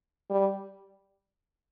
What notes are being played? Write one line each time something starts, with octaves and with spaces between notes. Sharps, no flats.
G3